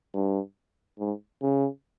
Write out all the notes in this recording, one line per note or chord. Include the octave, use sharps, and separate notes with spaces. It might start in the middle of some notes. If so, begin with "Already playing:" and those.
G2
G#2
C#3